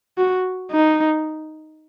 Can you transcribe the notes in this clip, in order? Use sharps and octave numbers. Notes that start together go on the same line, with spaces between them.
F#4
D#4